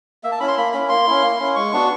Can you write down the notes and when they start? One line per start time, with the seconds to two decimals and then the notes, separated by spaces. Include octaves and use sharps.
0.23 A#3 E5
0.32 A5
0.40 C#4 E4 B5
0.48 C6
0.57 A#3 B5
0.73 C#4 E4 B5
0.89 A#3 C6
1.07 C#4 E4
1.22 A#3
1.39 C#4 E4
1.56 G#3 C#6
1.73 B3 D4 F#4